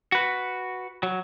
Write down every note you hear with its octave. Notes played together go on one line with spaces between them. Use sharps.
F#4 B4
F#3